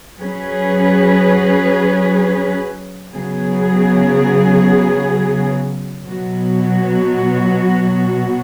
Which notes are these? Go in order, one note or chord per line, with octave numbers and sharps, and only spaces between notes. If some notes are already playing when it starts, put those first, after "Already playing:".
F#3 C#4 G#4 B4
C#3 F#3 B3 G#4
B2 F#3 B3 F#4